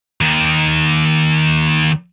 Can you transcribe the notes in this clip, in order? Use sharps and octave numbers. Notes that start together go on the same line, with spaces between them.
D#2 D#3